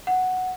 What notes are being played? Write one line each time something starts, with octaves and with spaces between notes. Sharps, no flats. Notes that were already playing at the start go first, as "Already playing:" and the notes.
F#5